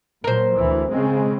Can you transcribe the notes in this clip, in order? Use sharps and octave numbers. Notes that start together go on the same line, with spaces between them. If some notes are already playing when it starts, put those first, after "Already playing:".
A#2 F#3 A#4 C5
D2 E3
C#3 G#3 C4